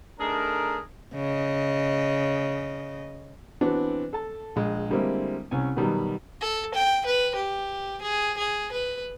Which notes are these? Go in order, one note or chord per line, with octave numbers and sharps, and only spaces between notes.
A3 D4 D#4 G#4 A#4
C#3 D#5
E3 B3 C4 D4 F#4
A4 A5
A#1 G#3
D3 G3 G#3 A#3 C4 E4
C2 C#4 G#5
B2 D#3 F#3 G3
A4
G5
B4
G4
G#4
G#4
B4